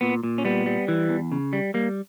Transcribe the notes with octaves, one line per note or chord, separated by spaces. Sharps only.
A#2 B3
A#2
C#4
G3 B3
G3
E3
E2
C#3
G3
G3 A#3